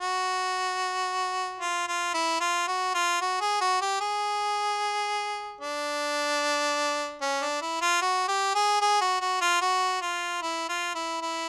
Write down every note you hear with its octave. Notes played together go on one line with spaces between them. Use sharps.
F#4
F4
F4
E4
F4
F#4
F4
F#4
G#4
F#4
G4
G#4
D4
C#4
D4
E4
F4
F#4
G4
G#4
G#4
F#4
F#4
F4
F#4
F4
E4
F4
E4
E4